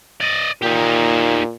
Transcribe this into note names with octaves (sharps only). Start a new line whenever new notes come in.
D5 D#5
A#2 D#4 G4